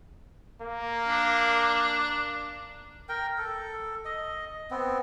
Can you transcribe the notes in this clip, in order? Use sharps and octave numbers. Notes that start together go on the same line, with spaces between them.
A#3
D4
A#4 G5
A4
D#5
B3 C4